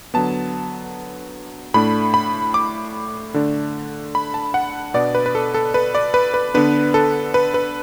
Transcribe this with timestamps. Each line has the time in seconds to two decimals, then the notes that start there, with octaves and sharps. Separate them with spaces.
0.14 D3 F#3 B3 A5
1.74 A2 A3 D4 B5
2.14 B5
2.54 D6
3.34 D3 A3 D4
4.15 B5
4.34 A5
4.54 F#5
4.94 B2 B3 D4 D5
5.15 B4
5.26 B4
5.35 A4
5.54 A4
5.74 B4
5.95 D5
6.14 B4
6.34 B4
6.54 D3 B3 D4 B4
6.94 A4
7.34 B4
7.54 B4